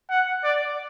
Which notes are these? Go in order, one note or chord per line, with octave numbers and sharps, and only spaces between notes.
F#5
D5